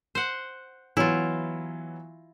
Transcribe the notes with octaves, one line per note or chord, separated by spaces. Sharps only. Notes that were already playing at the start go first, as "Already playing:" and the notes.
C5 F#5
E3 F#3 B3 E4 F4